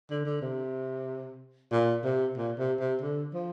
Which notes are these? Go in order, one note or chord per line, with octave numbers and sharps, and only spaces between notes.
D3
D3
C3
A#2
C3
A#2
C3
C3
D3
F3